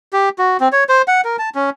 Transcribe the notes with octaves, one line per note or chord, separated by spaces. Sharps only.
G4
F#4
C4
C#5
C5
F#5
A#4
A5
C#4